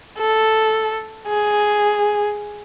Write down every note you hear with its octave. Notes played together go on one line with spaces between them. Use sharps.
A4
G#4